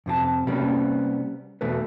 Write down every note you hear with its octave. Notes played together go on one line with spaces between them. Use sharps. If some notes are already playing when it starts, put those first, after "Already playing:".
F2 C3 F4 A5
C3 G3 A#3 B3 C#4
E2 B2 A3 B4